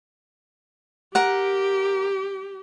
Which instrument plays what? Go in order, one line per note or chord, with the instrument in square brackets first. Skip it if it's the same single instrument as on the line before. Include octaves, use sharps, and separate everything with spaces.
[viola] G4 [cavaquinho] A#4 F#5